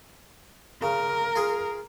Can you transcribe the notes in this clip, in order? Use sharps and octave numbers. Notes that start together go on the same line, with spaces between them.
C#3 A#4
F4 G#4